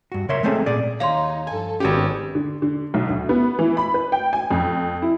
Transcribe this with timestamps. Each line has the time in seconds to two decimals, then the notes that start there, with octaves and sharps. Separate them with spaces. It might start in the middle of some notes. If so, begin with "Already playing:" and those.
0.12 G2 F#4
0.29 C#3 A#4 C#5 E5 C6
0.43 G#3 A3 C4 C#4 G#4 A4
0.66 A#2 G#4 D5
1.00 D#2 D#4 C#5 F5 C6
1.47 G2 F3 A4 G#5
1.80 G#1 G#3 B3 C#4 F#4 G4 C#5
2.35 D3
2.62 D3
2.94 B1
3.09 D2
3.29 B3
3.59 E3
3.77 B5
3.94 B4
4.12 G5
4.33 G#5
4.51 F2
5.02 E4